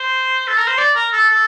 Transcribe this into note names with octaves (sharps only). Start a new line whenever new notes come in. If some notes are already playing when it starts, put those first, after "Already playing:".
Already playing: C5
A4
A#4
C5
D5
A#4
A4
A4